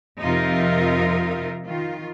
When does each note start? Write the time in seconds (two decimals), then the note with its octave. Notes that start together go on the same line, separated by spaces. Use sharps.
0.21 F2 C3 D#4 F4 A#4 E5
1.67 D#3 F4